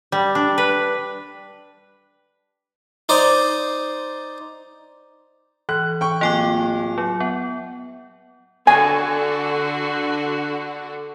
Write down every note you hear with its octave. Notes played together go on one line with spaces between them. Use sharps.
G3
D4
B4
D#4 C5 D5 D#6
E3 F#6
G5 C#6
D1 A#3 F4 G5 G#5 D6
F#3
B3 F#5
D3 F#4 G#5